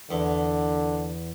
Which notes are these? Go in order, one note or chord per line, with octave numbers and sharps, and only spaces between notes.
E2 D3